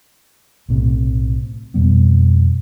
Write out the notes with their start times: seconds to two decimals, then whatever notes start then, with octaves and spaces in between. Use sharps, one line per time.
0.69 B1 A2 C3
1.74 F2 B2 G3 B3